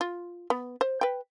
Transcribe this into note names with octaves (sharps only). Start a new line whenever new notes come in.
F4
B3
C5
B4 G5